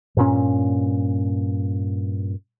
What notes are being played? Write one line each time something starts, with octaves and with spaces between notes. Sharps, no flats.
G2 A#2 C#4